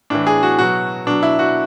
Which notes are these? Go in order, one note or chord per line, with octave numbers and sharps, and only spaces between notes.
A2 E3 D4
G#4
F#4
B2 F#3 F#4
B2 F#3 D4
E4
F#4